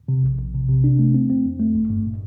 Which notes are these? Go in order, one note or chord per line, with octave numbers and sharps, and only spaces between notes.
C3
A#1
A#1
C3
C3
D4
A3
C4
C4
F2
A3
G1
G2
A#2